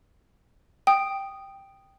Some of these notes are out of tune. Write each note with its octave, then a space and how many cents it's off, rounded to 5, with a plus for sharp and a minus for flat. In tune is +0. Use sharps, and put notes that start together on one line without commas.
G5 +0 D#6 -10